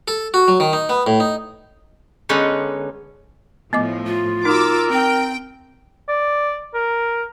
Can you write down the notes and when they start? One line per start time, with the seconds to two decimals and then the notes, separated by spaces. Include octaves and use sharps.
0.08 A4
0.34 F#4
0.48 F#3
0.60 D#3
0.73 D#4
0.89 B3
1.07 A2
1.20 D#4
2.29 D3 G#3 B3 C#4 D#4
3.73 A2 F3 B3 D#5 D6
4.06 F4
4.45 D#4 F#4 A#4 D6 E6
4.91 C4 G5
6.08 D5
6.74 A#4